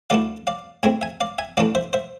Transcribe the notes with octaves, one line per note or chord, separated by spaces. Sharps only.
D2 D3 A3 E4 D5 F5
D5 F5
A2 G#3 C4 E5 G#5
E5 G#5
D5 F5
E5 G#5
A1 A2 E3 A3 D4 D5 F5
C5 E5
C5 E5